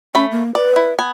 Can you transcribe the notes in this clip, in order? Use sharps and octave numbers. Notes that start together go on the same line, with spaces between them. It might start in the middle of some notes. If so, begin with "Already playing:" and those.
A3 C#4 B5
A#3
B4 D5
E4
B3 G#5